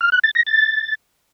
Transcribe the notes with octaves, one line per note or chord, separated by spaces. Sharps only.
F6
F#6
A6
A#6
A6